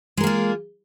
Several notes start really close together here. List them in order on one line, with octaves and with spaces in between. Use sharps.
G#3 A#4 A#3 F4